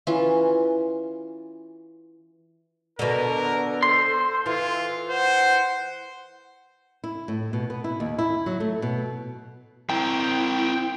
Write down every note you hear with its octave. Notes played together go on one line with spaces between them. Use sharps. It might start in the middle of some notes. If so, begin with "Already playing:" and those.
E3 C#4 F4
B2 D3 A4 A#4
C5 C6
E3 F4
C5 F#5
E4
A2
B2
B3
E4
D#2
E4
F#3
A3
B2
C4 E4 A#4 G5